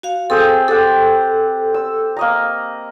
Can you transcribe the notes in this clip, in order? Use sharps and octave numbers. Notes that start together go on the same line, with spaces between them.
F#4 F5
C4 G#4 A4 C5
G4 A4 F#5
E6
A#3 D#5 A#5